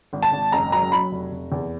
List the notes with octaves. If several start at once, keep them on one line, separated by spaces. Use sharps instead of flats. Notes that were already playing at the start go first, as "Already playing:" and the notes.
G#1
A5
G#1
F#1 A#5
F#3 A#5
F#3 B5
F1
F1
E2